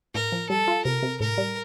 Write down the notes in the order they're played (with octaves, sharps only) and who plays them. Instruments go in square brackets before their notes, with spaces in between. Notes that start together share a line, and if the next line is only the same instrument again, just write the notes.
[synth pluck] A2 [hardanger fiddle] A#4
[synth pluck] F3
[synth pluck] G3 [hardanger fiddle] A4
[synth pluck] F4
[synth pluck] C3 [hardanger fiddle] A#4
[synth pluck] C3
[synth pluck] A2 [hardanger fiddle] A#4
[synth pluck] G3